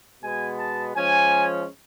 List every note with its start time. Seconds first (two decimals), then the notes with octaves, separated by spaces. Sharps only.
0.23 B2 G#3 B3 G#5
0.58 A5
0.95 F3 G#3 C#4 G#5